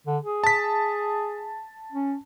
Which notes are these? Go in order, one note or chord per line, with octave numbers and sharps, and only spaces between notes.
D3
G#4
A5 B6
C#4